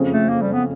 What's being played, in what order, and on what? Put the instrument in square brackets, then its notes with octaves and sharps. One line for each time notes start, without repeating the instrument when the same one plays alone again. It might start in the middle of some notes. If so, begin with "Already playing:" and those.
Already playing: [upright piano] F#1 F2 C#3 F3
[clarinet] A3
A#3
G3
B3